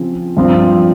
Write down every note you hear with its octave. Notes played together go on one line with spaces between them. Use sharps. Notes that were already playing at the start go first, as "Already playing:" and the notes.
Already playing: C#3 F3 C4
G2 F3 C4